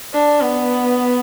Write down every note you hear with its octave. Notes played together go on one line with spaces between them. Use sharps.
D4
B3